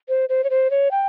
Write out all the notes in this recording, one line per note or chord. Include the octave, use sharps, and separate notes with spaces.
C5
C5
C#5
C5
C#5
G5